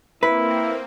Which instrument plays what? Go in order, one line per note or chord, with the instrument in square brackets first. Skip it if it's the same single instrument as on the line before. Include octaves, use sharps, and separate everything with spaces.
[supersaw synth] A#3 C4 [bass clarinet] E4 [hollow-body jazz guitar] B4